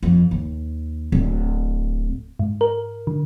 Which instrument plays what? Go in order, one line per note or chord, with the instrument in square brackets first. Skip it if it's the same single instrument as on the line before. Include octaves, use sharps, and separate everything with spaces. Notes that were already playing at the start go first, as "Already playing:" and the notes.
[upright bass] F2
D#2
D1
[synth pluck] G#2
A#4
D3